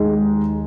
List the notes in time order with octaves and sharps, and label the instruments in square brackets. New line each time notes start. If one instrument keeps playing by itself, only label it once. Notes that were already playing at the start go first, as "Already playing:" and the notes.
Already playing: [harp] D#2 D#3 [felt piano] G#3 D#4 G#4